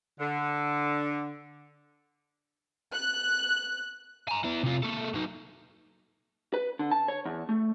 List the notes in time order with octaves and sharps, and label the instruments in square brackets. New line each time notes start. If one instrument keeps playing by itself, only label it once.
[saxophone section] D3
[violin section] F#6
[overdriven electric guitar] G#5 A#5
B3 E4
C3 F4
A#3 A4
F#3 D#4
[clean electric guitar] B4
D3
A5
C#5
E2
A3